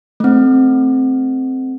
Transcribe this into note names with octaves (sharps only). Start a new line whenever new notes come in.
A3 C4